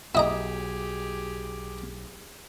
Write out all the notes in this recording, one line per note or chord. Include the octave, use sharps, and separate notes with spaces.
B1 E4 G4 G#4 D#5 A#5